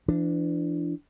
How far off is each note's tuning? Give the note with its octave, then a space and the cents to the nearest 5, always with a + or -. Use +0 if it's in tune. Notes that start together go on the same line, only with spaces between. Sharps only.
E3 +40 D4 +0